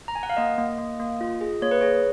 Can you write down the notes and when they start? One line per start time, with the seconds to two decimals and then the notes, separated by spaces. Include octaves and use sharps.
0.08 A#5
0.15 G#5
0.23 F#5
0.30 F5
0.37 A#3 D#5
0.58 A#3
0.78 A#3
1.00 A#3
1.21 F4
1.41 G#4
1.62 A#3 C#5
1.71 B4
1.81 G#4 C#5